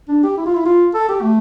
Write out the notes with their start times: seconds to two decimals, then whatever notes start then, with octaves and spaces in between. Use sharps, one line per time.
0.08 D4
0.23 G4
0.37 E4
0.46 F4
0.55 E4
0.65 F4
0.94 A4
1.09 G4
1.22 A3